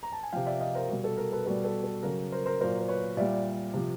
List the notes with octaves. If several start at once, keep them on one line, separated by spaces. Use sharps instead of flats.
A#5
A5
G#5
C3 F3 F5 G5
D5 E5
D#5 F5
A#4 C5
B2 G3
A4
A#4
A4 B4
B2 G3 A4 B4
A4
A4
C#3 F#3 A#4
A#4 C5
A#4 C5
A#2 F#3 A#4 C5
C5
B4 C#5
A#2 G3 D5 E5
C3 F3